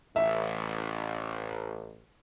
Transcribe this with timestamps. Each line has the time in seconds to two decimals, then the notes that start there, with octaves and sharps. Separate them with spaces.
0.16 A1 E5